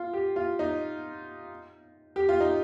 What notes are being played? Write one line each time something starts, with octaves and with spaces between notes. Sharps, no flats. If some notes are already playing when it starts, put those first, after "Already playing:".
Already playing: F4
G4
F4
D#4
G4
F4
D#4